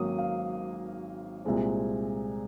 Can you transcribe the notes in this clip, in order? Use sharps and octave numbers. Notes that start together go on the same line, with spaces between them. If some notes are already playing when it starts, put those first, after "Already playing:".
Already playing: G#1 G#2 F#3 A#3 C#4 D#6
F5
C2 A#2 G#3 C4